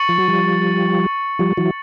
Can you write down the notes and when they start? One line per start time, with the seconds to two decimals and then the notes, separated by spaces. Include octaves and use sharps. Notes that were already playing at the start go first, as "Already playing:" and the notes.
Already playing: C#6 A6 C#7 F#7
0.09 F3
0.18 F#3
0.28 F3 G3
1.39 F3 G3
1.57 E3 F#3